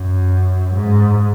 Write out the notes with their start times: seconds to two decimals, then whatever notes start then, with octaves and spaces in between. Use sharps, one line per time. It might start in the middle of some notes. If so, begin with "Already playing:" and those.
Already playing: F#2
0.75 G#2